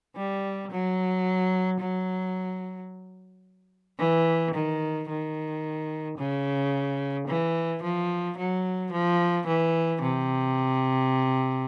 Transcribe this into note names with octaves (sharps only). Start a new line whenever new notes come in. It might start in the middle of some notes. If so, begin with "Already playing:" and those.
G3
F#3
F#3
E3
D#3
D#3
C#3
E3
F3
F#3
F3
E3
C3